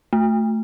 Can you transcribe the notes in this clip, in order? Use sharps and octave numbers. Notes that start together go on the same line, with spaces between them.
A3